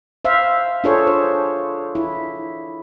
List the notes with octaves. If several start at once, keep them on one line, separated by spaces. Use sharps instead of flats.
C5 E5 F5
D4 F4 G#4 A4 C5 C#5
C5
E4